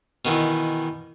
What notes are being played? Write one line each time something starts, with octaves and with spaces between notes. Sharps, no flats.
B2 D#3 E3